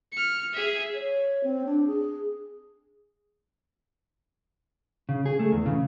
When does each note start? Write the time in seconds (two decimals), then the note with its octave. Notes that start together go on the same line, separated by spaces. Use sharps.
0.12 F6 C#7
0.53 G#4 E5
0.94 C#5
1.44 C4
1.65 D4
1.87 G#4
5.09 C#3
5.26 G#4
5.39 A3
5.52 E2
5.66 C#3